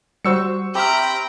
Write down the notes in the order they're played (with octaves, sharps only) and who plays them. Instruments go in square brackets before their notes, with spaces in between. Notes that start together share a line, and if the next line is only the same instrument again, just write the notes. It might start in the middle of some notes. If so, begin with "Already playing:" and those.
[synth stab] G3 F#4 C5 [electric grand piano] C#6 E6 C#7
[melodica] C4 B5 [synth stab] G4 E5 F6 [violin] G5 A#5